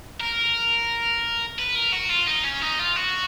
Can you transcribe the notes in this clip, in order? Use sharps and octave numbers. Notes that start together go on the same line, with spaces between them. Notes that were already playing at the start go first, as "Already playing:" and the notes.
A#4
B4
A#4
F#4
F4
D#4
C#4
D#4
F4
F#4